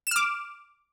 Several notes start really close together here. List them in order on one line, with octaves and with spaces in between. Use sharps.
E7 F6 D6